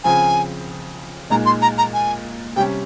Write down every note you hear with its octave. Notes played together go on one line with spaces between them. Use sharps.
C#3 F3 C4 G#5
A#2 G#3 D#4 A#5
C6
A#5
A#5
G#5
C3 G3 C#4 G5